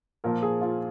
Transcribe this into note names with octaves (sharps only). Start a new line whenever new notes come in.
A#2 F3 A#4
G#4
F4